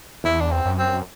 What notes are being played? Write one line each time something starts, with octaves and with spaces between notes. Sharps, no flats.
E2 E4
D4
C4
F#2
C4